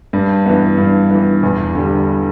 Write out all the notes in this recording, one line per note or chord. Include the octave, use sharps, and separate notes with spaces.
G2
E3 B3
G2
E3 B3
E2
D3 G3